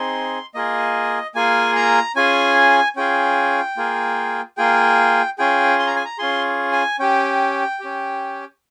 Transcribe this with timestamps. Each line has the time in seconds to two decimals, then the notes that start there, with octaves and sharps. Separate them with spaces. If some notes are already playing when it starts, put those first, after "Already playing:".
Already playing: C4 D#4 G#4 C6
0.54 A#3 F4 G#4 D#5
1.35 A#3 F4 G#4 G#5
1.76 A#5
2.16 C#4 F4 G#4 G#5
2.96 C#4 F4 G#4 G5
3.77 A#3 F4 G#4
4.57 A#3 F4 G#4 G5
5.38 C#4 F4 G#4 G5
5.79 C6
5.87 A#5
5.95 G#5
6.05 A#5
6.19 C#4 F4 G#4 C6
6.72 G#5
6.99 C#4 G4 G5
7.80 C#4 G4